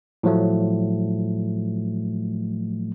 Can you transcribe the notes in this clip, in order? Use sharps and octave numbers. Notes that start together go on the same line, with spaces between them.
A2 F3 F#3 A3